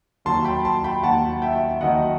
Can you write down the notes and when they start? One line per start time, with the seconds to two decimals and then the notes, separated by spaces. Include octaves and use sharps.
0.25 D#2 D#3 F#3 A5 C6
0.44 G5 B5
0.65 A5 C6
0.84 G5 B5
1.03 D#2 D#3 F#3 F#5 A5
1.42 E5 G5
1.81 D#2 D#3 F#3 D#5 F#5